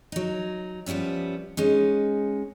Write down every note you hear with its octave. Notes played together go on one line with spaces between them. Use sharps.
F#3 D#4
F3 G3 B3 C#4 E5
G#3 C#4 D#4